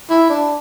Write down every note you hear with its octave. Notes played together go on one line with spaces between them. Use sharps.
E4
D4